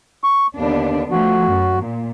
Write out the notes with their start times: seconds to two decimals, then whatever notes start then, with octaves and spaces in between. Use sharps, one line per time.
0.24 C#6
0.56 D#2 D3 B3 D4
1.11 F3 A3 F#4
1.49 F#2
1.81 A#2